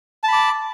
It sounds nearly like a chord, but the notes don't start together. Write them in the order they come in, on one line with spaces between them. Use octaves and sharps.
A5 B5 D6